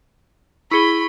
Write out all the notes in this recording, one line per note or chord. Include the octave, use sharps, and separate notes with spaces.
E4 G#4 B5 C#6 C#7 G7